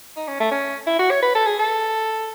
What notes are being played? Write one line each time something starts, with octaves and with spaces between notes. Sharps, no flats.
D#4
C#4
A3
C#4
E4
F#4
C#5
B4
A4
G#4
A4